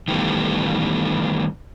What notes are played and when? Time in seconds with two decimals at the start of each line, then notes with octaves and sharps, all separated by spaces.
0.08 D#3 E3 G3 A3 B3